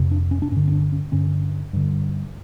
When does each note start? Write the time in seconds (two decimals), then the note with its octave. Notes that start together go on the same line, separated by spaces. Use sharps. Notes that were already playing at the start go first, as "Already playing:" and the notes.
Already playing: F2 C3
0.11 D4
0.31 C#4
0.42 D4
0.51 G2 C#4
0.56 D3
0.68 C#4
0.72 D4
0.92 C#4
1.12 G2 D3 C#4
1.73 G2 D3